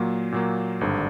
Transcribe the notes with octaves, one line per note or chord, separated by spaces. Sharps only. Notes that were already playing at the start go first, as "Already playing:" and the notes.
Already playing: A#2 F#3 A#3
A#2 F#3 A#3
G#1 G2 D3